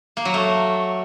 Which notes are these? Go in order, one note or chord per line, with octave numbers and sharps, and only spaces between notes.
A#3
F#3
A3